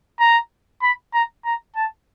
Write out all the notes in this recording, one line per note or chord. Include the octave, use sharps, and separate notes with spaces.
A#5
B5
A#5
A#5
A5